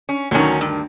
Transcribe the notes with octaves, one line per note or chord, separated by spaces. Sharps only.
C#4
D2 D#3 F#3 C#4
G2